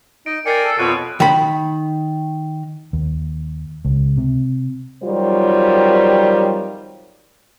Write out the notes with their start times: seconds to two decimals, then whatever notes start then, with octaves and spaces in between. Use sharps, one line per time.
0.26 D#4 D#5 D7
0.46 A#4 D5 G5 G#5 A6 C7 C#7
0.63 A4
0.79 F2 B2 F4 C#5 F#6 A6 D#7
1.20 D#3 B5
2.93 D#2
3.85 C#2
4.17 C3
5.04 F2 D#3 F#3 G3 F4 C5